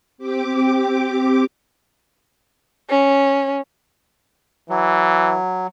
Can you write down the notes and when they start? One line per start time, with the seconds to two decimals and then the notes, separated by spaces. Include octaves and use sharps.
0.18 C4 G4 D6
2.89 C#4
4.70 E3 F#3